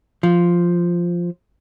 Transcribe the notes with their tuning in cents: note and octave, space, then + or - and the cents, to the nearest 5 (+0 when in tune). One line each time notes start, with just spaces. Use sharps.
F3 -5